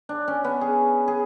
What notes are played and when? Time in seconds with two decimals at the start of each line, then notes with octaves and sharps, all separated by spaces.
0.09 D4
0.28 C#4
0.44 B3
0.61 G#4
1.08 G#4